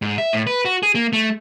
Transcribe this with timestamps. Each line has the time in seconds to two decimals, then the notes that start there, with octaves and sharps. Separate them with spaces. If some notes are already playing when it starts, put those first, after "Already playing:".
0.02 G#2
0.18 E5
0.33 A2
0.47 B4
0.65 F#4
0.83 G#4
0.95 A#3
1.13 A3